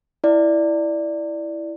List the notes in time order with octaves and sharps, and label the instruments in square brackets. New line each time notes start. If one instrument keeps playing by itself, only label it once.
[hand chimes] E4 D5